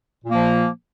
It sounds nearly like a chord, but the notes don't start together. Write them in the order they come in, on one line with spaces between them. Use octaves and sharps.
A#2 A#3 F3